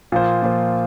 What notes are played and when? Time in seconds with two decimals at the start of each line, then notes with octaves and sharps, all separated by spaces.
0.12 A#2 F3 A#3 F4 C5
0.42 A#2 F3 A#3 F4 C5